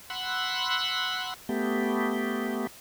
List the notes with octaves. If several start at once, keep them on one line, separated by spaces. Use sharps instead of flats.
F#5 B5 C6 E6 F#6
A3 B3 G4